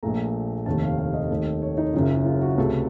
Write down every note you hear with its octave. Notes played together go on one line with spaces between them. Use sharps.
A#1 A#2 A3 A#5
F1 D#2 D#3 A3 A5
F5
F5
D#5
D#2 D#3 A3
C#5
D#4
F#1 F#2 C#3 F4
F4
F#4
C#2 C3 F#3 A3 A4